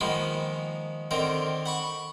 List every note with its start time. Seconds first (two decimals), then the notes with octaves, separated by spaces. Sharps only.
0.01 D#3 F3 G#3 A#3 B3
1.11 D3 D#3 C4 A#4
1.66 F#5 B5 C#6